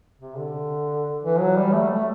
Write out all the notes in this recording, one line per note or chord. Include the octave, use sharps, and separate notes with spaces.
C3
D3
E3
F#3
G3
A3
A3